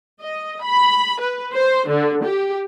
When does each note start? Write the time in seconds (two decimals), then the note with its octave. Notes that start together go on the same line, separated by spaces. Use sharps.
0.21 D#5
0.63 B5
1.21 B4
1.54 C5
1.89 D3
2.24 G4